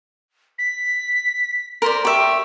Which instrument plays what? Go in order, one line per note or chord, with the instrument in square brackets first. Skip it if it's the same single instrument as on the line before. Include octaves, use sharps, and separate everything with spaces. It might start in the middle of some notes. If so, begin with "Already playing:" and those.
[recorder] B6
[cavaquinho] A#4 C5 D5
[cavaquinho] G4 E5 [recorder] C#6